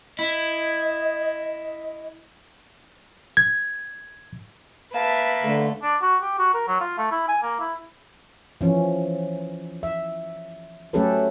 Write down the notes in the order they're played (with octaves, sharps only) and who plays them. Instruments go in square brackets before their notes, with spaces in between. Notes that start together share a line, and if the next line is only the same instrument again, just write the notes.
[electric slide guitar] E4 [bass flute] D#5
[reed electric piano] G#6
[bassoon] A#3 [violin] B4 E5 [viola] A5
[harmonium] D3 [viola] A3
[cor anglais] D4
F#4
G4
F#4
A#4
F#3
F4
A3
E4
G#5
A#3
E4
[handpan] E3 F3 C#4
E5
F#3 A3 C#4 G4 A4 B4